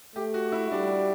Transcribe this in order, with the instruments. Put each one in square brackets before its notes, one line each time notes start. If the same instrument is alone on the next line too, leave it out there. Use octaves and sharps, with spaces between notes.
[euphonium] A3 [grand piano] G4
[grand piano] F#4
E4
[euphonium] G3 [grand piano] D4